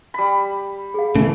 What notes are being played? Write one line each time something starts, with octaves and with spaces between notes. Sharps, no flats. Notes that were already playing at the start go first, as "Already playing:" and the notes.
G3 B5
G#4 F5
C#3 E3 A3